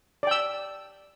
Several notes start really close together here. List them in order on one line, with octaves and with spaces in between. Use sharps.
D5 G5 E6